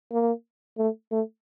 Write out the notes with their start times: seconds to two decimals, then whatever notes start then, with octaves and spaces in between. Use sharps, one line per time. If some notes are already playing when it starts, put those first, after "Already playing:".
0.11 A#3
0.78 A3
1.11 A3